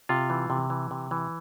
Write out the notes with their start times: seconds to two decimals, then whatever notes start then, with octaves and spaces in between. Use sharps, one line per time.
0.09 C3 F4
0.30 E3
0.50 C3
0.70 E3
0.91 C3
1.11 E3